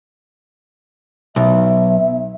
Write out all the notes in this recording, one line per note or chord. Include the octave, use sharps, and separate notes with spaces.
B1 E5